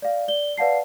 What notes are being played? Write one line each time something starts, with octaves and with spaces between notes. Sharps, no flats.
D5 F5
D5 G7
B4 D5 F5 F#5 A5 C7